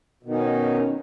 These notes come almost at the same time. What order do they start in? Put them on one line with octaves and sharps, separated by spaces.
B2 D#3 D#4 C#4